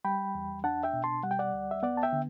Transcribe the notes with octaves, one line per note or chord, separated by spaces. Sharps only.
G3 G5 B5
E2
D4 F#5 A5
E5 G5
B2
A5 C6
G3 F#5
G5
D5 F#5
D2
E5
B3 D5 F#5
A5
E5 G5
D3